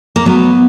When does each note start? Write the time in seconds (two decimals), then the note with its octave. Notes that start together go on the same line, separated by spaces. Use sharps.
0.16 A#3
0.26 F#3 B3